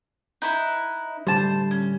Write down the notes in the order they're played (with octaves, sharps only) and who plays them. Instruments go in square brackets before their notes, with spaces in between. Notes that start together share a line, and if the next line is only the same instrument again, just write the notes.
[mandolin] D#4 E4 B4
[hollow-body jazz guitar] A2 D3 G3 [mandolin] C5 A5
[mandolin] C#4